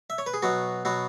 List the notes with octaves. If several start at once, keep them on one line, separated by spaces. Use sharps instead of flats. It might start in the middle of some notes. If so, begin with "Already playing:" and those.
E5
C#5
B4
G#4
B2 F#3 B3 F#4
B2 F#3 B3 F#4